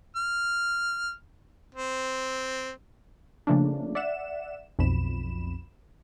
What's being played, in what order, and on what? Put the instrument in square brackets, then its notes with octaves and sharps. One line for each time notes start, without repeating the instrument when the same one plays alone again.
[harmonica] F6
C4
[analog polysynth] C#3 F3 A3 A#3 D4
D5 E5 F#5 E7
B1 F2 B5 E7